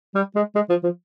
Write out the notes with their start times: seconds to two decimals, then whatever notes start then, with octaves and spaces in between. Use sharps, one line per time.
0.15 G3
0.35 G#3
0.55 G#3
0.69 F3
0.84 F3